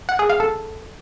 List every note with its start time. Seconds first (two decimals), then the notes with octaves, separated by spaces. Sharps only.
0.09 F#5
0.19 G#4
0.30 F5
0.40 A4